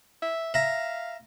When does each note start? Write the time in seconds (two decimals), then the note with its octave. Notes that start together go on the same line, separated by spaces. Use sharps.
0.22 E5
0.54 E5 F5 A#5